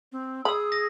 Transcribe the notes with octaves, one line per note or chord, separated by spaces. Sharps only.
C4
G#4 B5 D#6 E6
D#6 A#6